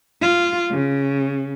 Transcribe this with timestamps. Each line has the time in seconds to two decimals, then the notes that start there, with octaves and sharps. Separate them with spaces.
0.21 F4
0.71 C#3